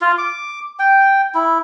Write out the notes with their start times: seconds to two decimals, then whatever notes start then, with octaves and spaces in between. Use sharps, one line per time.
0.01 F4
0.18 D6
0.79 G5
1.35 E4